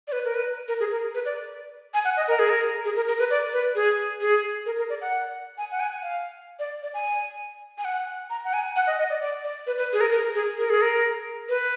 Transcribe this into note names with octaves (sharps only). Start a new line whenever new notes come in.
D5
B4
A#4
B4
A#4
G#4
A#4
B4
D5
G#5
F#5
D#5
A#4
G#4
A#4
G#4
A#4
A#4
B4
D5
B4
G#4
G#4
A#4
A#4
D5
F#5
G#5
F#5
G#5
F5
D5
D5
G#5
G#5
F#5
A#5
F#5
G#5
F#5
D#5
D#5
D5
D5
D5
B4
B4
G#4
A#4
A#4
G#4
A#4
G#4
A#4
B4